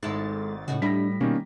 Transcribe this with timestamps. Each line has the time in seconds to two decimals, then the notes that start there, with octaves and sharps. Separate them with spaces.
0.03 G#1 G#2 G#3 E4 A4 A6
0.68 A2 C#3 D#4 F#4
0.82 G3 D4 E5 B5 A#6 B6
1.20 B2 D#3 G3 A#3 C#4